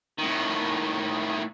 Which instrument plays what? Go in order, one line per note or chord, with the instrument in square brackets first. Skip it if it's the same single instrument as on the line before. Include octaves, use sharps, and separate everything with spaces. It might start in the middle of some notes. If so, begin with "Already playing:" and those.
[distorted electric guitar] A2 D#3